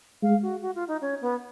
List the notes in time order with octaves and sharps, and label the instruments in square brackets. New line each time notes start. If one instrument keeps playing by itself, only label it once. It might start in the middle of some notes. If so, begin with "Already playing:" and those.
[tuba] G#3 [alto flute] F5
[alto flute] F#4
F#4
F4
D#4
C#4
B3